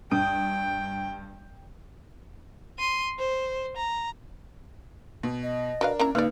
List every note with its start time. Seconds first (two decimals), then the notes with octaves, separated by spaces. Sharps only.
0.11 G2 G5 D#6 D7
2.79 C6 D#7
3.19 C5
3.77 A#5
5.23 B2
5.43 D#5
5.81 D4 F#4 A#4 B4 F5
5.99 A#3 C#4 E4 A#5
6.15 C#2 G#3 A#3 D#4 B4 D5